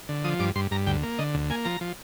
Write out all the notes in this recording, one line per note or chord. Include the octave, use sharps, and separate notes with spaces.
D3
F3 D#6
G2 D6
G2 C6
G2 A#5
D2 G5
A#3
D3 D#5
D2
A#3 G#5
F3 A#5
F3